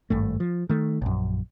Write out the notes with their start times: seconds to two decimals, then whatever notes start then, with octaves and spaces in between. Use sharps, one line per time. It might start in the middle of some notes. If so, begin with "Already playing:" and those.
0.10 G#1 G2 A3
0.40 F3
0.69 D#3 A3
1.02 A#1 F#2